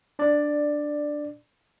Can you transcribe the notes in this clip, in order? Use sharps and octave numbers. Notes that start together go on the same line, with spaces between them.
D4 D5